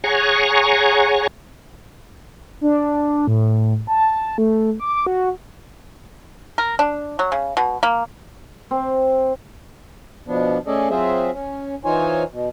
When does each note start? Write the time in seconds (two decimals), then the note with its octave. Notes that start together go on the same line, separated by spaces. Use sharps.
0.04 G#4 C#5 F#5 G#5 A#5 C#6
2.61 D4
3.27 A2
3.87 A5
4.38 A3
4.80 D6
5.06 F#4
6.58 A#4
6.79 D4
7.19 F#3
7.32 C#3
7.57 B2
7.83 A#3
8.71 C4
10.27 B2 F3 B3 D4
10.67 A3 C#4 G#4 A4 D5 D#5
10.90 F#3 C4 F4 G#4 C5 E5
11.33 C#4
11.85 E3 D#4 F4 C5 C#5 G#5
12.32 B2